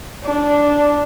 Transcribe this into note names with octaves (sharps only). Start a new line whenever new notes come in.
D4